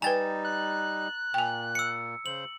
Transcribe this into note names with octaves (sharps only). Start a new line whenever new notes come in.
G3 D#4 B4 G5 G#5 A#5 A6
F#6
A#2 G5 G#5
E6 C#7
C#3 C5 F#7